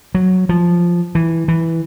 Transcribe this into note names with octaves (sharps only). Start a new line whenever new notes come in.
F#3
F3
E3
E3